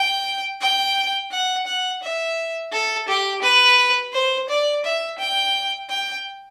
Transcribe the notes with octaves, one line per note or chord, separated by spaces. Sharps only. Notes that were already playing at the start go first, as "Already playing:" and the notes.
Already playing: G5
G5
F#5
F#5
E5
A4
G4
B4
C5
D5
E5
G5
G5